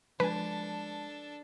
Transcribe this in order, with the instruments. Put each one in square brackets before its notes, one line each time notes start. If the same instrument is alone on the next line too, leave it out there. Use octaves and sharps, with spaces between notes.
[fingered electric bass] F3 G#3 [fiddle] D4 A4 [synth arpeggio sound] B4 G#5 [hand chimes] A5